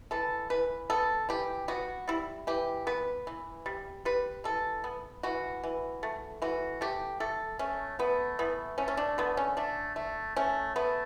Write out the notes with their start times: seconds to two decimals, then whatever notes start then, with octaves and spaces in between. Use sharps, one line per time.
0.11 E3 A4
0.50 E3 B4
0.90 B3 A4
1.29 E3 G4
1.68 B3 F#4
2.08 G3 E4
2.47 E3 G4
2.87 B3 B4
3.27 E3
3.66 G3
4.05 G3 B4
4.44 E3 A4
4.84 B3
5.23 E3 F#4
5.64 E3
6.03 A3
6.42 E3 F#4
6.81 A3 G4
7.20 A3 A4
7.59 A3 C#4
7.99 A3 B3
8.39 E3 B3
8.78 A3 C#4
8.88 C#4
8.97 D4
9.18 D3 B3
9.37 C#4
9.57 A3 D4
9.96 A3
10.36 A3 C#4
10.76 A3 B3